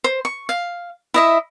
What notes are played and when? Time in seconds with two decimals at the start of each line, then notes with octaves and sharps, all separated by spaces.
0.04 C5
0.25 C#6
0.49 F5
1.14 E4 D#5 E5